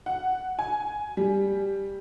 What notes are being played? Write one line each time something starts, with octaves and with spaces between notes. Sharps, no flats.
F#5
G#5
G3